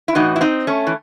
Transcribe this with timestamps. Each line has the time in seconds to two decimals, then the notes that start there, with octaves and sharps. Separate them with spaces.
0.08 E4
0.15 A2 E3 D#4 F#4
0.36 E4
0.41 C4 D#4
0.67 A3 C#4
0.87 E3